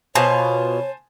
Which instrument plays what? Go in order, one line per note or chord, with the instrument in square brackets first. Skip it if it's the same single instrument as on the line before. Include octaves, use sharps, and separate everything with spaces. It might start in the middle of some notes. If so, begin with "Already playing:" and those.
[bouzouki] B2 F4 [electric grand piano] C5 G#5 A5 [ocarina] C#5